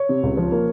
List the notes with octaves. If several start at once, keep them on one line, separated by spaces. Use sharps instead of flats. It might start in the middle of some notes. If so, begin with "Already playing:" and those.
Already playing: C#5
C3
C#2
F3
A#3